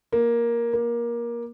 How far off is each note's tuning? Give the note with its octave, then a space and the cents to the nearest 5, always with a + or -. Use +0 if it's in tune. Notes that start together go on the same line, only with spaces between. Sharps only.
A#3 +10
A#3 +20